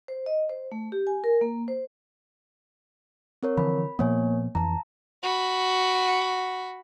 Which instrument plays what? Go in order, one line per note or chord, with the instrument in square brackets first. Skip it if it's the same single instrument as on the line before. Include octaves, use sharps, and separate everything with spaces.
[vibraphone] C5
D#5
C5
A3
G4
G#5
A#4
A#3
C5
[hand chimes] C4 A#4 C#5
[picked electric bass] D3 E3 F3 [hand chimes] B5
[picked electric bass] A#2 F3 B3 [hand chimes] A#3 C#5 G#5
[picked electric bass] F2 E3 [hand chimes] A5 A#5
[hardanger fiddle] F#4 B5